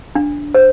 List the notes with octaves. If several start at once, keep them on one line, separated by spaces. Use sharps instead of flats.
D4
C5